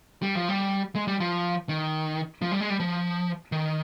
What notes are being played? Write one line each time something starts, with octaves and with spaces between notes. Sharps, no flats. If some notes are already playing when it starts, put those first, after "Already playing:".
G3
F3
G3
G#3
G3
F3
D#3
F3
G3
G#3
G3
F3
D#3